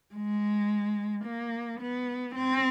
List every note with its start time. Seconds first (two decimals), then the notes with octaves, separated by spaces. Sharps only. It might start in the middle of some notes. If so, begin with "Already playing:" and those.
0.14 G#3
1.25 A#3
1.81 B3
2.35 C4